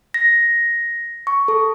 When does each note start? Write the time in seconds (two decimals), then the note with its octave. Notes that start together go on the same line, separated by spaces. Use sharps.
0.14 A#6
1.27 C#6
1.48 A4